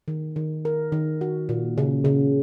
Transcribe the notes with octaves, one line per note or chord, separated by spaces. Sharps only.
D#3
D#3
A#4
D#3
F#4
A#2
C#3
C#3